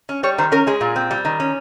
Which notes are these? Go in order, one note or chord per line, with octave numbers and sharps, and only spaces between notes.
C#4
G3 C#5
D#3 C5
C#4 A#4
G#3 G#4
A#2
C4
G3
D#3
C#4